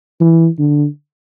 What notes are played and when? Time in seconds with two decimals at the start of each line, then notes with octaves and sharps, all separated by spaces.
0.21 E3
0.59 D3